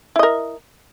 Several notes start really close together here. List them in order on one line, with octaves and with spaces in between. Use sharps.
E4 D#5 A#4